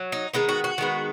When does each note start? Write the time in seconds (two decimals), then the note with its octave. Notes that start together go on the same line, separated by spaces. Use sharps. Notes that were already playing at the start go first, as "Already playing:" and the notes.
Already playing: F#3
0.12 D#4
0.34 D#3 G#3 B3 D#4
0.49 F#4
0.64 F#4
0.78 D#3 G#3 B3